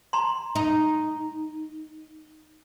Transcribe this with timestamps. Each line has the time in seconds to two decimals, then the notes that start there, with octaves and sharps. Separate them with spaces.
0.13 A#5 C6
0.55 D#4